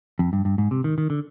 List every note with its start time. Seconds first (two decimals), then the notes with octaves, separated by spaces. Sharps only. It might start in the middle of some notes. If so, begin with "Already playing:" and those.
0.19 F2
0.33 G2
0.45 G2
0.58 G#2
0.71 C3
0.84 D#3
0.98 D#3
1.10 D3